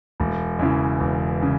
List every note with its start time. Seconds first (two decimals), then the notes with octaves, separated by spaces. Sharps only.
0.20 E1
0.59 E2 C#3 E3
1.00 E1
1.42 C#3